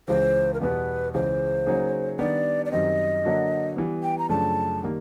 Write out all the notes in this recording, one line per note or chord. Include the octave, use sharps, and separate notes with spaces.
C#2 C#3 E3 C5
A#4
E2 B2 G3 B3 B4
C#2 C#3 E3 G#3 C5
C#3 F#3 A#3 D#4 G#4
D#3 G3 B3 D4 G4 D5
D5
F#2 D#3 G3 C4 D#5
D3 F#3 A#3 D4 F#4
E3 G3 B3
G5
A#5
F#2 C#3 F3 A3 D4 A5
D#3 G3 A#3